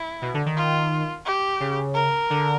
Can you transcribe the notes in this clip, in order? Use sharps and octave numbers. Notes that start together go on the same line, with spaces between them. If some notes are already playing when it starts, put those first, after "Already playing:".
Already playing: E4
B2
D3
D#3
F4
G4
C#3
A#4
D3